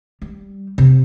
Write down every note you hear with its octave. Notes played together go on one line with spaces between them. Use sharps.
G3
C3